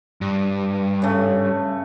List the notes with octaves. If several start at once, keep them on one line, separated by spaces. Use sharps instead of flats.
G2
C#3 A3